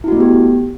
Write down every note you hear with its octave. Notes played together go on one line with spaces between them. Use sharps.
A3 B3 E4 F#4 G4